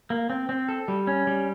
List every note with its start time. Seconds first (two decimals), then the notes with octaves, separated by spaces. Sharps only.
0.10 A#3
0.30 C4
0.49 C4
0.69 A4
0.88 G3
1.07 C#4
1.27 G3